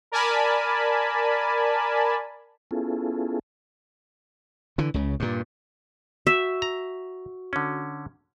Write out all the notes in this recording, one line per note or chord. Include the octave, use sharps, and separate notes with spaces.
A#4 D5 G#5 A5 B5
B3 C#4 E4 F4 G#4 A4
D3 E3
C#2 C#3
G2 A#2
F#4 E5
A#5
D3 C#4